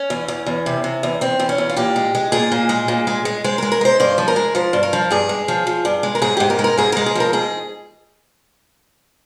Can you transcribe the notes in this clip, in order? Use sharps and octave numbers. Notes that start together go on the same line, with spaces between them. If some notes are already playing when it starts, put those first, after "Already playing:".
Already playing: C#4
E2
E2
E2
C3
C3
E2
E2 C4
E2
C#4
E2
F4
A#2 G4
G#3
G#3
A#2 G#4
A#2
G#3
A#2
G#3
G#3
G#3 C5
G#3 A#4
A#4
G#3 C5
G2 C5
F3
A#4
G#3
F3 C5
G2
A#4
F3
G2 G#4
G#3
F3
F3
G2
G#3
A#4
G#2 G#4
G#2 G4
A#4
G#3
A#4
G#2 G#4
G#3 A#4
G#4
F3 A#4
G#2 G#4